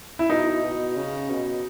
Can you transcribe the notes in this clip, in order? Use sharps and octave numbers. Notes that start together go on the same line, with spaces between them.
E4
B2 D#4
B2
C#3
B2